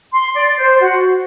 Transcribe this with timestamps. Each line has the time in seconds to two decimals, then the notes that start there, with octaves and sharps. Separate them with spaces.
0.13 C6
0.35 D5
0.57 C5
0.80 F#4